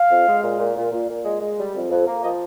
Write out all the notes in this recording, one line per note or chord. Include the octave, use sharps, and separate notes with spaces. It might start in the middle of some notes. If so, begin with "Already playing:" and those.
Already playing: F5
F2
G#3
A#2
A#2
A#2
A#2
A#2
G#3
G#3
G3
F2
F2
A#3
F3 D#5